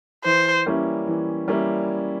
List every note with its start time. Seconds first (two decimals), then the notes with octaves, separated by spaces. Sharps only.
0.24 E3 C5
0.66 G3 A#3 C#4 E4
1.07 E3
1.48 G3 A#3 C#4 E4